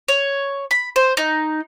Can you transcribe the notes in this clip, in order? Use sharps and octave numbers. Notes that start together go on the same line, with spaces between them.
C#5
B5
C5
D#4